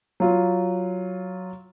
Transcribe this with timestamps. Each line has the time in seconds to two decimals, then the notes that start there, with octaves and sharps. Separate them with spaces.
0.20 F#3 F4